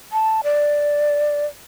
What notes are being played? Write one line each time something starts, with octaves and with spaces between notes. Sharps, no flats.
A5
D5